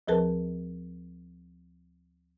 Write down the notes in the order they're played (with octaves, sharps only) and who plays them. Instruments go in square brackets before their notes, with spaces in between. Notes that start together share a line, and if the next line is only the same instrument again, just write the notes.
[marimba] D2 F3 G#4 A#4 B4 A5